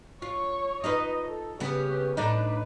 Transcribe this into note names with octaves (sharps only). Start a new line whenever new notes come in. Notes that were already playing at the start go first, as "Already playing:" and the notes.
F4 C#5 C#6
D#4 F4 B4 D#5
A4
C#3 B3 C#4 G4
A2 D4 D#4 B4